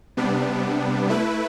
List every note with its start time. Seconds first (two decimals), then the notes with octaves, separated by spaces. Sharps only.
0.17 C3 G3 B3 D4
1.09 A3 E4 B4